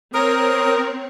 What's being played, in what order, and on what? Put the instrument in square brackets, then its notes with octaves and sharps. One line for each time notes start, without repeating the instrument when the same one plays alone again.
[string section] C4 C#5 [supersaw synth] A#4 [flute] D#6